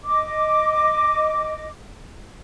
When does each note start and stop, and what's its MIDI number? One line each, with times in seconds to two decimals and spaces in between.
0.04 1.68 75
0.04 1.68 86